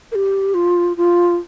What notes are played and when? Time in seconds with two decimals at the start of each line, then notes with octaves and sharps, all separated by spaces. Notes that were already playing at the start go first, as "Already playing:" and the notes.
0.12 A#4
0.15 G4
0.54 F4
0.97 F4